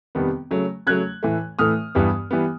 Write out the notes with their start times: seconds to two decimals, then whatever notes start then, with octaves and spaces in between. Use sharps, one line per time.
0.15 F2 C3 D#3 G3 B3
0.51 C#3 F#3 A3
0.87 C#3 F#3 A3 F#6 G#6
1.23 A2 E3 A3
1.59 A2 E3 A3 D#6 F6
1.95 G2 E3 G3 B3
2.31 E3 G3 B3